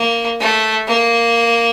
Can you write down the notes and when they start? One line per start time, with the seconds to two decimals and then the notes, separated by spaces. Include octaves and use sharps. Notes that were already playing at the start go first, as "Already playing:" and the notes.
Already playing: A#3
0.40 A3
0.88 A#3